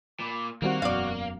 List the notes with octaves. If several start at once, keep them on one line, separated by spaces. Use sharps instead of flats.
A#2 B5 D6
D#3 G3 A#3 C4 F#4
E1 F#2 B2 D5 F5